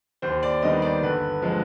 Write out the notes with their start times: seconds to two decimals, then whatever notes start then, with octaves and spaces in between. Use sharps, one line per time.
0.22 D#2 C5
0.43 D5
0.62 D#3 G3 B3 D#5
0.82 D5
1.03 G1 B4
1.42 F3 G#3